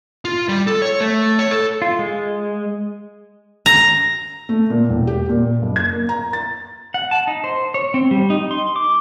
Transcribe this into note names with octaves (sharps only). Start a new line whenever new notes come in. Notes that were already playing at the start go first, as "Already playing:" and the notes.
F4
G3
A4
C#5
A3
C#5
A4
F4
G#3
A#5
A3
A#2
E1
G4
A#2
F#1
G#6
A#3
A#5
A6
F#5
A5
D#4
C5
C#5
C4
G3
D#4
C6
D6